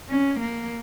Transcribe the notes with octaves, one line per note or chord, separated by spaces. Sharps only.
C#4
A#3